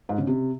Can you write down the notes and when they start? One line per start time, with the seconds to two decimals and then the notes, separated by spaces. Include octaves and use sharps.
0.09 G#2
0.18 C#3
0.27 C3